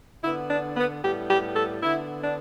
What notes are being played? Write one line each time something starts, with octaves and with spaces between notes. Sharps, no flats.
D3 B3 E4
D4
B3
A2 G3 B3 G4
G4
A4
D3 B3 E4
D4